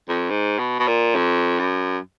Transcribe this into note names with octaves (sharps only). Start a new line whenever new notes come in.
F2
G#2
B2
B2
A#2
F2
F#2